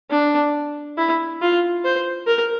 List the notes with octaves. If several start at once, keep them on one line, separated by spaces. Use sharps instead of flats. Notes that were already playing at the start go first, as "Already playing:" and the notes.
D4
E4
F4
C5
A#4